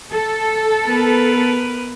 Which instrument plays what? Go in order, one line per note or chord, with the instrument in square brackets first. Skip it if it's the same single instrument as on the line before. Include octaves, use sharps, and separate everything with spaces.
[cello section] A4
[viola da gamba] B3 A#4 B4